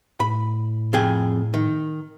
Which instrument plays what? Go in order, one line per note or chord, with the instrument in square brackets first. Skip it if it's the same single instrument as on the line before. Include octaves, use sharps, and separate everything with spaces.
[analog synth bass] A2 [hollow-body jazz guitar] B5
[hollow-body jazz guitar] F2 G#4 G5
D#3